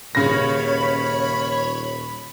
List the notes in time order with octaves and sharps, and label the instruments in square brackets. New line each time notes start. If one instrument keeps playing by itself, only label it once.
[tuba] D#1 [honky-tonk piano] C#3 A#6 [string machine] C#5 [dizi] B5